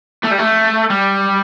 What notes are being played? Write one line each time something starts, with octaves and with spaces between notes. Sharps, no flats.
A3
G3
A3
G3